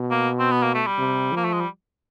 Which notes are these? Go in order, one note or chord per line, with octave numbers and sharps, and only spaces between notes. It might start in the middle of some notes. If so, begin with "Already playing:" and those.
Already playing: B2
A#3
C4
B3
A#3
A3
G3
C3
F3 A#3
A3
G#3
G3